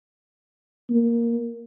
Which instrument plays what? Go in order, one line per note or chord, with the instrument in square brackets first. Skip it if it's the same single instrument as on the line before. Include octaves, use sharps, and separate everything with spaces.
[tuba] A#3